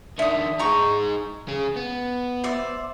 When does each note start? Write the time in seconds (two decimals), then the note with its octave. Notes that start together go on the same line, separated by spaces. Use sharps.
0.19 D#3 D4 E5 D#6
0.59 D#4 G#4 A#5 C#6
1.48 C#4 G#4
1.76 B3
2.44 C5 D5 E5